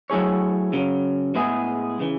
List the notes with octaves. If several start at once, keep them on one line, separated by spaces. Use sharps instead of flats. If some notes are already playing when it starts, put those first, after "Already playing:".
F#3 A3 E4 G#4 C#5
F#2 C#3 F#3
A2 G#3 B3 E4 G#4
C#3 E3